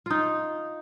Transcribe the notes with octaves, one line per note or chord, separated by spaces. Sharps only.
D#4 F4